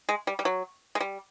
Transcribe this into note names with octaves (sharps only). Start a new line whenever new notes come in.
G#3
G3
G3
F#3
G#3
G3